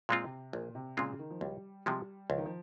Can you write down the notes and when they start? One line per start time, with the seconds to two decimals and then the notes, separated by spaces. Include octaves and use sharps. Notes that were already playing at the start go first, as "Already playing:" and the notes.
0.09 A#2 G#3 C4 F4
0.24 C3
0.53 A#1 A#2
0.75 C3
0.97 A#2 C#3 G#3 C4 F4
1.19 D#3
1.30 F3
1.41 C#2 G3
1.86 C3 F3 G3 G#3
2.30 C#2 F3
2.38 D#3
2.45 F3